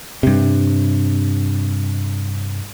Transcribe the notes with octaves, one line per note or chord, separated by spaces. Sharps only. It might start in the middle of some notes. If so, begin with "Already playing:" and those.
G2 C3